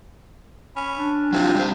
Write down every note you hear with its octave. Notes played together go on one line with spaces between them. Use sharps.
C#4 B5
D4
C3 F#3 E4 F4
G3 C4 C5